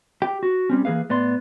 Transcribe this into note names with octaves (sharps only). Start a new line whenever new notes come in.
G4 G5
F#4
G3 C4 C#4
E3 A#3 G#4 B4 F5
A2 B3 D5 C6